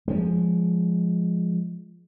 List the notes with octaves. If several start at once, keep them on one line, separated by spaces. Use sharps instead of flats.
F3 G#3